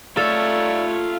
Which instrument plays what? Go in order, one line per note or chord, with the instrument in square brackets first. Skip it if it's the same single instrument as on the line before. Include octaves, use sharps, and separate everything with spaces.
[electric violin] A3 C#5 [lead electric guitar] F4 E5 [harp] A4 [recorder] D5